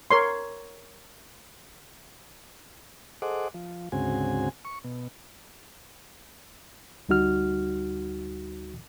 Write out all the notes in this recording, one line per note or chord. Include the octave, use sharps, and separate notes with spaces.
A#4 C#5 C6
G#4 A4 C5 D#5 F#5 D6
F3
D2 G#2 C#3 C4 F#4 G#5
C#6
B2
D2 G3 D#4 F#4 F6